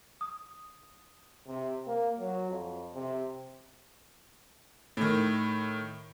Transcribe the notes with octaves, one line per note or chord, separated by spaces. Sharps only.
D#6
C3
A#3
F#3
F2
C3
A2 D#3